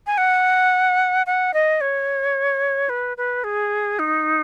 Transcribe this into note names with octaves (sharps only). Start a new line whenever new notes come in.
G#5
F#5
F#5
D#5
C#5
B4
B4
G#4
D#4